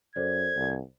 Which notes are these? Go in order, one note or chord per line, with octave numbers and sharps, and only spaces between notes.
F#2 A4 C5 D5 G#6
C2